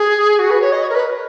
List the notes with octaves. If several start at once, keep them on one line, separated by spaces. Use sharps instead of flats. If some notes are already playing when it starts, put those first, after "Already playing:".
Already playing: G#4
F#4
B4
C#5
D#5
C#5
A#4
B4